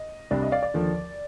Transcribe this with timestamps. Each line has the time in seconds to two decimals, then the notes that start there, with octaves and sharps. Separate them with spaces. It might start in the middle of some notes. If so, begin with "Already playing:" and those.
Already playing: D#5
0.31 C2 C3 G3 D4 D5
0.42 D#5
0.52 D5 F5
0.63 D5
0.74 D#2 D3 F3